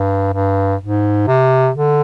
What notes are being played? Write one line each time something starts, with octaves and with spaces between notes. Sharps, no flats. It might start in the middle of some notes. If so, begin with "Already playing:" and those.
Already playing: G2
G2
G#2
C3
D3